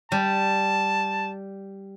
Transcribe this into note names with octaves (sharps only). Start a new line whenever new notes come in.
G3 A5